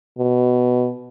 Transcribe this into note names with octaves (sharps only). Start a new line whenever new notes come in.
B2